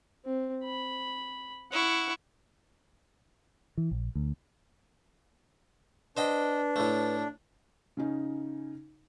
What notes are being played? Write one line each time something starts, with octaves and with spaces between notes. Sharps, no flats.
C4
B5
E4 F#5 C#6
E3
A#1
D2
D4 B4 C5 D#5 G5
A2 A3
C#3 C#4 D#4